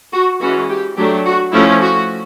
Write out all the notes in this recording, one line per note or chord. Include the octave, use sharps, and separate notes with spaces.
F#4
E3 G#3 C#4 F#4
G4
F#3 A3 D4 G4
F#4
F3 A3 C#4 E4
F#4